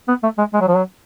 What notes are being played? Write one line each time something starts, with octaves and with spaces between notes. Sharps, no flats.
B3
A3
G#3
G#3
F#3
F3
F#3